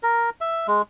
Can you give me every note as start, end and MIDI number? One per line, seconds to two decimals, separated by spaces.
0.03 0.30 70
0.41 0.67 76
0.68 0.82 56